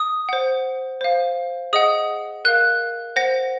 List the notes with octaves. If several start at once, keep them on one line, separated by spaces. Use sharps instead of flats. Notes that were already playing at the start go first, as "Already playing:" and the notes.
Already playing: D#6
C5 F#5
C5 F5
G#4 D#5 F#5 D#6
A#4 F5 F#6
C5 F#5 A#6